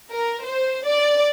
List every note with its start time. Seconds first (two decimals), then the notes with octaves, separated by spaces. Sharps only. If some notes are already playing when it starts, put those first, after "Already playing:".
0.10 A#4
0.44 C5
0.86 D5